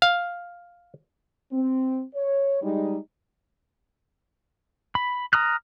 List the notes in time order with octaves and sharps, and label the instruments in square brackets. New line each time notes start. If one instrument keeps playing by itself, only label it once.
[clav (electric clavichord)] F5
[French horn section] C4
C#5
G3 G#3 D#4
[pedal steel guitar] B5
A#5 D#6 F6 F#6